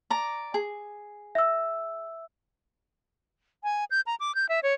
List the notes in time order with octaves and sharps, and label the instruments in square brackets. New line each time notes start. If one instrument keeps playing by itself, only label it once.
[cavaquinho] D5 A#5
G#4
[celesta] E5 E6
[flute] G#5
G6
A#5
D6
G6
E5
C#5